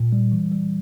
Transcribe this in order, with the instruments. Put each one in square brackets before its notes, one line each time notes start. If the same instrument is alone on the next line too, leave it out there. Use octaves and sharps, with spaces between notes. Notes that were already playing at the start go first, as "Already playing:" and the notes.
Already playing: [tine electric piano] A#2
G3
E3
G3